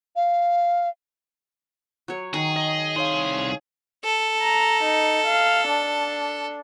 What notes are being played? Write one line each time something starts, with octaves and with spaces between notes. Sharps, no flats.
F5
F#3 C#5
D#3 G#4
D#5
C2 D#4 C#5 F5 C6
A4
A#5
D#4
F5
D4